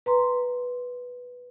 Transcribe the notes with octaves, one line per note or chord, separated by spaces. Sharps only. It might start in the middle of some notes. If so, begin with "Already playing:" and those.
B4 A#5 C6